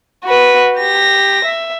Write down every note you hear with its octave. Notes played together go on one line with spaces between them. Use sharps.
F#4 B4
G4 A#6
E5